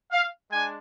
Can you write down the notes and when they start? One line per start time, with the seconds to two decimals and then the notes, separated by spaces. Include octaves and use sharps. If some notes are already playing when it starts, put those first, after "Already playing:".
0.11 F5
0.49 G#3 D4 G#5